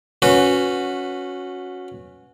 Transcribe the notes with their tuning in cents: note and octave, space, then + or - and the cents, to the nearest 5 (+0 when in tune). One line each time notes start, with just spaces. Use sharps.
C#4 +0 F#4 -15 B4 +0